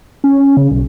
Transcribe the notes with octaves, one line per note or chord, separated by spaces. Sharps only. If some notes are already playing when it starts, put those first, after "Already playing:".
C#4
C#3
B1